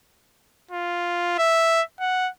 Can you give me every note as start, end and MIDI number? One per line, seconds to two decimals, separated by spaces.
0.71 1.38 65
1.38 1.82 76
2.00 2.29 78